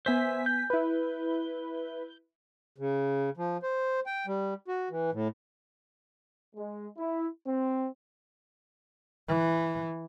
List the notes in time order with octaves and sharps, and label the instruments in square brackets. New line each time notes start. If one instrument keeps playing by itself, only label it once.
[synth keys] B3 G#5 B6 [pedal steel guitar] C5 E5
[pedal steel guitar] G6
[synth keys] E4 B4
[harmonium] C#3
F3
C5
G5
G3
F#4
E3
A2
[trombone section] G#3
E4
C4
[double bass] E3